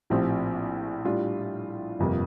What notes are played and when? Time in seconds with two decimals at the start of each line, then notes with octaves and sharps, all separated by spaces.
0.10 A#1 A2 F3 C4 G4
1.05 A2 G3 D4 F4
1.99 G1 F2 C3 G3 A#3